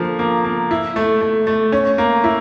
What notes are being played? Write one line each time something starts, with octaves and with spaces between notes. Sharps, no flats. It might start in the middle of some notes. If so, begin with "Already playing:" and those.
Already playing: D3 F3 A#3
A#3
A#3
E4
A3
A3
A3
C#4
A#3
E4